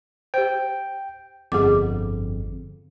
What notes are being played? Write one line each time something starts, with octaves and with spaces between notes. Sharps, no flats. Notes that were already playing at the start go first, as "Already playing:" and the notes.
G4 C5 G5
G1 F2 G#4 F#5 D6